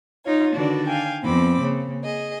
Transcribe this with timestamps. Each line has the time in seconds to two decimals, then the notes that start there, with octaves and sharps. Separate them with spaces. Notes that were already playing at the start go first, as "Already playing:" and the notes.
0.24 D#4 F4 C#5
0.54 D3 D#3 D4 F#4 B4 D5
0.87 F5 G5 G#5
1.22 F2 B3 C4 B5 D6
1.59 C#3 A#3
2.02 G#4 D#5